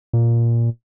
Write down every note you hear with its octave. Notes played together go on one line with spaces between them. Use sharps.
A#2